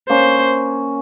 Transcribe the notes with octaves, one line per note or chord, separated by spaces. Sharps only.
A#3 C#4 C5